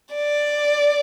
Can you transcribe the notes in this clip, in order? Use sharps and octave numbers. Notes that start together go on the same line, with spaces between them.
D5